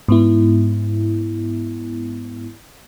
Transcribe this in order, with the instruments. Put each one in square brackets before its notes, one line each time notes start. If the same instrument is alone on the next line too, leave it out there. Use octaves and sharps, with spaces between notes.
[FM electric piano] G#2 B3 E4